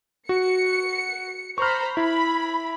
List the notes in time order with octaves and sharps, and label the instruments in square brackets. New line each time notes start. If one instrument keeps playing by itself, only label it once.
[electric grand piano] F#4 [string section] C#7
[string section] C5 A#5 B5 [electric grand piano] C#6 F6
[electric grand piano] E4 [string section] B5